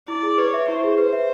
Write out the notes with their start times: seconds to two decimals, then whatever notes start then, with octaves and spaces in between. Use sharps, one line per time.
0.08 E4 D5
0.23 G#4
0.38 B4 C#5
0.54 E5
0.68 E4 C5
0.84 G#4
0.98 B4
1.13 E5